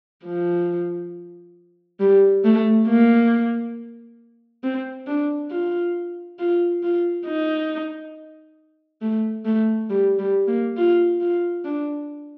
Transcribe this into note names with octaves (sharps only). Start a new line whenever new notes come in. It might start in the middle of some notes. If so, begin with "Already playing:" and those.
F3
G3
A3
A#3
C4
D4
F4
F4
F4
D#4
A3
A3
G3
G3
A#3
F4
F4
D4